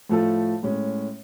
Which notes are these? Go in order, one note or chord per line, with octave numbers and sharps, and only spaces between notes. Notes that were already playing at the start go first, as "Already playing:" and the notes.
A2 F3 A3 F4 A4
A2 G#3 C#4